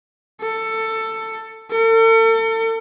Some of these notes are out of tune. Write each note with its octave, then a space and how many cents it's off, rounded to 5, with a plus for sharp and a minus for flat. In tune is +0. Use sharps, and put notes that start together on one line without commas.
A4 +15
A4 +40